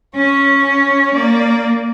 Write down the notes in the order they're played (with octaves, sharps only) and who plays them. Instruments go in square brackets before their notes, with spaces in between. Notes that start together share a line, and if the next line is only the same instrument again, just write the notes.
[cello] C#4 [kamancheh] C#5
[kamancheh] C#5
[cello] A#3 [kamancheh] D5